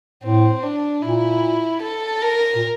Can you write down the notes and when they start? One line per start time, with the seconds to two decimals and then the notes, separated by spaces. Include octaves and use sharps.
0.24 A2 C4
0.63 D4
1.02 A#2 E4
1.82 A4
2.22 A#4
2.56 A#2